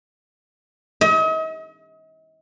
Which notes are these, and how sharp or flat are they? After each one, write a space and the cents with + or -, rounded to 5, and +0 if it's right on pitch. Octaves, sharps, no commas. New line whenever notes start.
D#5 +40